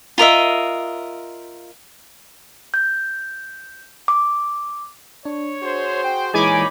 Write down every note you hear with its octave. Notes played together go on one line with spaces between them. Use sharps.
F4 A#4 D#5 E5
G6
D6
D4 C#5
F#4 G#4 C5
G5
A#2 E3 G#3 D#4 C#5 G#5 B5 D6